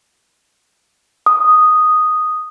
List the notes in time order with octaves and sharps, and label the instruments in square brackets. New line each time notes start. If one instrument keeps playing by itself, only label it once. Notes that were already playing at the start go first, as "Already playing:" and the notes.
[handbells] D#6